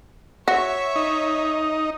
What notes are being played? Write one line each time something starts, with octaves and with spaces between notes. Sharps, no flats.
F#4 C#5 E5 C#6
D#4